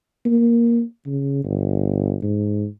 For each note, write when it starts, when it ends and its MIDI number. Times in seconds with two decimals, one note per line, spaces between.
0.26 0.82 58
1.06 1.44 49
1.45 2.17 31
2.23 2.67 44